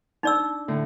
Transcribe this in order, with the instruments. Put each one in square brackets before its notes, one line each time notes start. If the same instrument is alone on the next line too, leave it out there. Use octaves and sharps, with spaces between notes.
[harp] D4 [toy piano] D#4 D5 E6
[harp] A2 D3